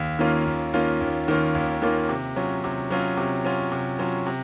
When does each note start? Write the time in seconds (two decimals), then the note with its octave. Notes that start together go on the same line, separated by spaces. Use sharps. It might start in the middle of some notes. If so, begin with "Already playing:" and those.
Already playing: D#2
0.19 D#3 A#3 C#4 F4
0.46 D#2
0.74 D#3 A#3 C#4 F4
1.00 D#2
1.28 D#3 A#3 C#4 F4
1.55 D#2
1.82 D#3 A#3 C#4 F4
2.09 C3
2.36 F#3 C#4 F4
2.64 C3
2.90 F#3 C#4 F4
3.17 C3
3.45 F#3 C#4 F4
3.72 C3
3.99 F#3 C#4 F4
4.27 C3